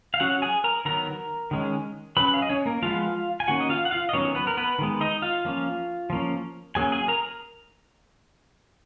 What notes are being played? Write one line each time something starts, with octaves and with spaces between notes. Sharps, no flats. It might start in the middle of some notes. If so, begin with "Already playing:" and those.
F5
F#3 C#4 F#4 F#5
G#4 G#5
A#4 A#5
D#3 F#3 B3 A#4 A#5
D#3 G#3 C#4
F#3 C#4 B4 B5
F5
D#5
C#4 C#5
A#3 A#4
F3 G#3 B3 F4 F5
G#5
D#3 A#3 C#4 F#4 F#5
D#5
F4 F5
F#5
F4 F5
D#5
D#3 F#3 B3 C#4 C#5
B3 B4
A#4
B3 B4
D#3 G#3 B3
D#4 D#5
F4 F5
F3 A#3 C#4
F3 A#3 C#4
F#3 A#3 C#4 G#4 G#5
G#4 G#5
A#4 A#5